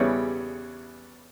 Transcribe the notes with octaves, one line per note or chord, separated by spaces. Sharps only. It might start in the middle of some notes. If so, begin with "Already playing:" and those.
Already playing: E2 C#3 E3 G3 B3 C#5